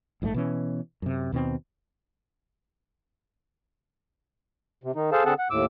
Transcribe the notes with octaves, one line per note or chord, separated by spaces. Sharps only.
A#1 G#2 E3 A3
B2 E3 C#4
F#2 C3
D#2 B2 D#3 C4
C3
D#3 D#4
G#4 A4 C5 F5 A5
D3 C4 G#4 A4 F#5 A5
F#5
D#2 A2 D6 E6